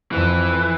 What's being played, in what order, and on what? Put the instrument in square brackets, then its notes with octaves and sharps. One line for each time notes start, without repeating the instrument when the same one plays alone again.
[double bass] F2 [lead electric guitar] E3